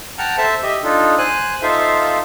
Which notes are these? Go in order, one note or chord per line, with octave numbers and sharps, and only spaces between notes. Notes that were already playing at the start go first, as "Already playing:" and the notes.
F#5 G5 A5 A#5 F6
A4 C5 E5 A5
G4 D#5 E5
D4 D#4 F4 A4
C5 G#5 F#6
D#4 F4 A4 C5 E5 F5